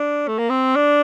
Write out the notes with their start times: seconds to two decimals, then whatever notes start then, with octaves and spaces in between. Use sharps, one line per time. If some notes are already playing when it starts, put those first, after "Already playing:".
Already playing: D4
0.28 A3
0.38 A#3
0.49 C4
0.76 D4